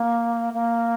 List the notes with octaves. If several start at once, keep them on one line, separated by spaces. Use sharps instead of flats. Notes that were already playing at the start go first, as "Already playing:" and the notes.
Already playing: A#3
A#3